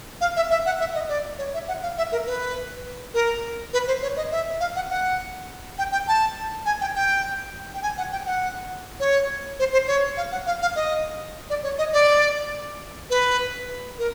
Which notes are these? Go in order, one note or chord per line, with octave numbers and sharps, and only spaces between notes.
F5
E5
E5
F#5
E5
D#5
D5
C#5
E5
F#5
F5
E5
A#4
B4
A#4
B4
C5
C#5
D#5
E5
F5
F#5
F#5
G5
G5
A5
G#5
G5
G5
G5
G#5
F#5
G5
F#5
C#5
C5
C5
C#5
F5
F#5
F5
F5
D#5
D5
C#5
D#5
D5
B4
A#4